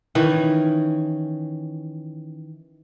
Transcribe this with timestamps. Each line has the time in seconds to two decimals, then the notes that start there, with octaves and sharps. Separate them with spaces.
0.15 D#3 E3 C#4